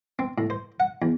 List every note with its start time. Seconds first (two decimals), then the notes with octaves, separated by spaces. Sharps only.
0.19 C4
0.38 A2
0.50 C5
0.80 F#5
1.02 E2